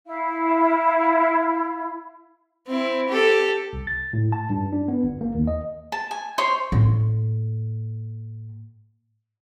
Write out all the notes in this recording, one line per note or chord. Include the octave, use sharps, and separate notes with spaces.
E4 F5
C4 E4
G4 A4
C2
A6
A2
A5
G2
D4
B3
G1
A#3
D#2
D#5
A5
G#5
C5 C#5 C6
A2 A#3